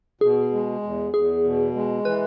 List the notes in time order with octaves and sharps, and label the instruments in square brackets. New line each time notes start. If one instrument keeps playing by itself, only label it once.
[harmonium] B2 [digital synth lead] G#4
[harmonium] G#3
E2
[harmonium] E2 [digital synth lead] G#4
[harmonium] B2
G#3
[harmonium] E3 [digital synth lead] B4